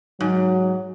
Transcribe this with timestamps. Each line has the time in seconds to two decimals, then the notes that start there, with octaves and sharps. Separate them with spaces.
0.21 G#2 F#3